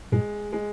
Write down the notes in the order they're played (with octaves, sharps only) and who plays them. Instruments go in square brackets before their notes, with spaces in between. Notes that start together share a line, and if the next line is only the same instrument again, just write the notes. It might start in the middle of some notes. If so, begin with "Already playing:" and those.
[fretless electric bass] G2 A#2 [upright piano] G#3
[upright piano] G#3